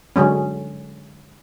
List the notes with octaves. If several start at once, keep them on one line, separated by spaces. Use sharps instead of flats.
D3 F#3 G#3 C#4